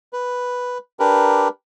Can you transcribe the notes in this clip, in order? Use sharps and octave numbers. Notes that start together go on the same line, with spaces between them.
B4
D4 G4 A#4 B4